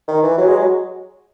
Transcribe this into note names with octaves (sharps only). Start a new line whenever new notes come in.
D#3
E3
F#3
G#3
F#3